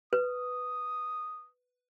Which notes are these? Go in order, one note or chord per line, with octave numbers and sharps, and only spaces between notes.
B4 D#6